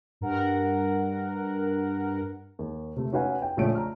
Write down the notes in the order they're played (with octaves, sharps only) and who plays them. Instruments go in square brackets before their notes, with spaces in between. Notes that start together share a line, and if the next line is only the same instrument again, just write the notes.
[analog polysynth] G2 A#4 F#5
[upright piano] D#2
C3 A3
C#4 D#4 F#4 B4 F5 G#5
G5
A#1 C#3 A3 C#5 D7
A#5 F6